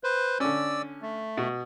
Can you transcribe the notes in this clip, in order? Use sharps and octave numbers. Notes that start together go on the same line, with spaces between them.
B4 C5
D3 C#4 D5 E6
A3
B2